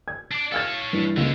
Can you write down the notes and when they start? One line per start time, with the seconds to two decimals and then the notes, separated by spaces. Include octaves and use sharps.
0.08 G#6
0.31 D4 D5
0.52 A4 C#5 F5 F6 A6
0.93 G2 E3
1.17 C#2 D3 A#3 C#5